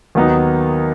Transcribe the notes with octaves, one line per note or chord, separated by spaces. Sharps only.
D#2 D#3 F#3 B3 D#4